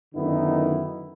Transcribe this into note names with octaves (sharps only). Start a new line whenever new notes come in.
F#2 D3 D#3 B3 D#4 E4